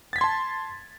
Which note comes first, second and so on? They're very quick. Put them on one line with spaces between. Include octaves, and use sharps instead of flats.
A6 B6 G#6 C6 A5